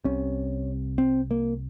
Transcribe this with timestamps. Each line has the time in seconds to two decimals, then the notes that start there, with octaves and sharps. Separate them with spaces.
0.04 C2 C3 C#4
0.98 C4
1.31 A#3